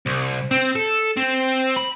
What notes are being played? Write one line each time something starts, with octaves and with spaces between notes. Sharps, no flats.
C2
C4
A4
C4
B5